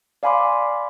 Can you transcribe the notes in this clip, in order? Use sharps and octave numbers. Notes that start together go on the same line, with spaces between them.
D5 F5 G#5 B5 C6 D6